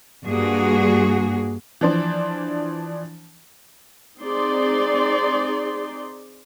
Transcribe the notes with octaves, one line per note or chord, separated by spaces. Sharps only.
G2 A#3 F#4 G#4
E3 F3 D4 C5
C4 D#4 G#4 D5 C6